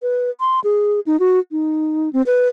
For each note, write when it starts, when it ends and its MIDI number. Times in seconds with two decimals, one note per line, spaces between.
0.02 0.30 71
0.40 0.60 84
0.64 1.00 68
1.06 1.19 63
1.20 1.39 66
1.51 2.09 63
2.13 2.22 60
2.26 2.48 71